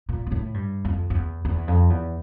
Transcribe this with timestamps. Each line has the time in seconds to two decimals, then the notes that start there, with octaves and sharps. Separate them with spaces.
0.09 A#2
0.27 A#2
0.32 A2
0.54 G2
0.85 F2
1.10 F2
1.15 E2
1.45 E2
1.68 F2
1.90 E2